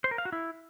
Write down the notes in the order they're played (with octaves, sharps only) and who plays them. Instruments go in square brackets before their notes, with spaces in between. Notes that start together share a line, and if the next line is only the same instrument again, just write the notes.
[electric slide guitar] C5
A#4
F5
F#4
E4